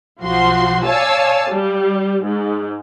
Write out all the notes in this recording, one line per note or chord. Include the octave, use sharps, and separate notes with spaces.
B1 F3 F#4 C6
C#5 D5 F5 G#5 A5 E6
G3
G#2